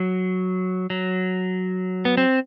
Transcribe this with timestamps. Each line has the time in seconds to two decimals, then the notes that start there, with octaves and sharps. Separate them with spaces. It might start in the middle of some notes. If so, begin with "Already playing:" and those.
Already playing: F#3
0.90 F#3
2.05 B3
2.17 C4